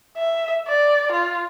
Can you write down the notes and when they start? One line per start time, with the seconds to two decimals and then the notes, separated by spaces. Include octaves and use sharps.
0.18 E5
0.68 D5
1.12 F4